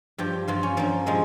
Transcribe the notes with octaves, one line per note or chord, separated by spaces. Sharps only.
G2 F3 G4
G2 F3 F4
C#4
G2 F3 A#3
A#2 F3 G#3